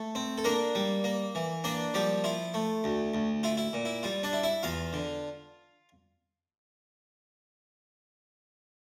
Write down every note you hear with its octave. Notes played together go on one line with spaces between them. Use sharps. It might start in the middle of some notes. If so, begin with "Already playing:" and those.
Already playing: A3 A4
C4
A4
A#3 D4 A#4
G3
A#3
E3
A#3 D4 D5
F3 G3 G4
E4 F4
A3
D2
D2
E4 F4
E4
A#2
E4
G3 F4
D4 D5
E4
E4 E5
E2 F4 F5
D3